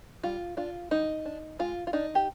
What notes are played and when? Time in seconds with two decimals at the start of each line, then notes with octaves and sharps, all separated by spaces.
0.24 G3 F4
0.57 D4 F4
0.91 G3 D#4
1.25 D4
1.59 G#3 F4
1.87 F4
1.93 D4 D#4
2.15 G4